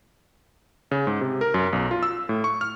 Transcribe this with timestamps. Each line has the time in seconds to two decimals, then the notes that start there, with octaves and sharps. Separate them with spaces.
0.91 C#3
1.07 G#2
1.21 C3
1.41 A#4
1.54 F#2
1.73 B1
1.91 F4
2.03 E6
2.29 A2
2.44 C#6
2.61 F6